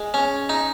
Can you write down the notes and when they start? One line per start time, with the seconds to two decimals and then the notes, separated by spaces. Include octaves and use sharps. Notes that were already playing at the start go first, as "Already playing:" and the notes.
Already playing: G#3
0.14 C#4
0.49 D#4